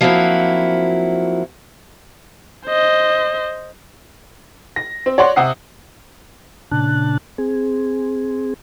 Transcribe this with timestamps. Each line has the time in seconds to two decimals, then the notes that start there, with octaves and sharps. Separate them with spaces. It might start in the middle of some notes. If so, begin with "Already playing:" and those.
0.01 F3 F#3 A#3 C4 E4 F#4
2.66 C5 D#5
4.76 A#6
5.06 C4
5.18 C#5 D5 F#5 C6
5.36 C3 F#5 D#6 C7
6.71 A#2 C#3 D4 A5 F#6
7.38 C4 G#4